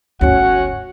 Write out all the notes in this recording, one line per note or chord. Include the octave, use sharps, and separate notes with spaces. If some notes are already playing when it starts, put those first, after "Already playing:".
G1 D2 C#4 F#4 F#5